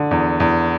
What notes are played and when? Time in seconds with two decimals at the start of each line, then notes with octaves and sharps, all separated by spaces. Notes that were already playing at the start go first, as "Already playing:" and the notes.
Already playing: D3
0.11 E2
0.40 E2